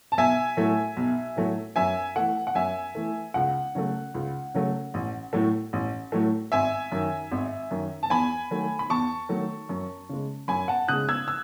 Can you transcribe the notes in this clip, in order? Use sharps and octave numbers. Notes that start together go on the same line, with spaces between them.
A5
B1 E5 G#5
A2 F#3 A3
B1
A2 F#3 A3
F#2 E5 G#5
E3 A3 F#5
F#5
F#2 E5 G#5
E3 A3
C#2 F#5
C#3 F#3 A3
C#2
C#3 F#3 A3
A1
A2 F#3 A3
A1
A2 F#3 A3
G#1 E5 G#5
F#2 D#3
G#1
F#2 D#3
A5
E2 G#5 B5
D#3 F#3 A3
B5
E2 A5 C#6
D#3 F#3 A3
F#2
C#3 G#3
F#2 G#5 B5
F#5 A5
C#3 G#3 D#6 F#6
E6 G#6
E6